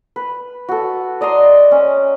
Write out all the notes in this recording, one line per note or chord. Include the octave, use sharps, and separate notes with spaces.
B4
F#4 A4
D5 D#5 A#5 C6
C#4